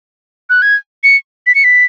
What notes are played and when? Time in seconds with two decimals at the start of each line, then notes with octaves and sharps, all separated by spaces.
0.50 F#6
0.62 G#6
1.04 C#7
1.47 B6
1.55 C#7
1.64 B6